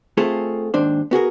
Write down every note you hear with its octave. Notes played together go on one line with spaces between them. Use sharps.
A3 C4 F4 G#4 A4
D#2 G#2 D4 C5
B3 F#4 G#4 A#4